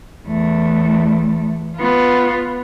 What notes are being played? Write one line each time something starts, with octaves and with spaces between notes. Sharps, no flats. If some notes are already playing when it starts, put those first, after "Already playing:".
E2 A3
B3 F4